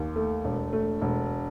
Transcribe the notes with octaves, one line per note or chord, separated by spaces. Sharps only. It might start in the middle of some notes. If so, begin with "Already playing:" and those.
Already playing: D#2
A3
E1
A3
E1